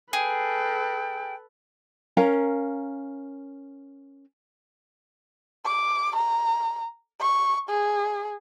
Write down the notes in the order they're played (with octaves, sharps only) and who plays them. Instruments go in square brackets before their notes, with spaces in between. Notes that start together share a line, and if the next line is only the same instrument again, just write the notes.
[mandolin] G#4 [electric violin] A4 B4 [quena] G5
[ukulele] C#4 A#4 F5 A#5
[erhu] D6
A#5
C#6
G#4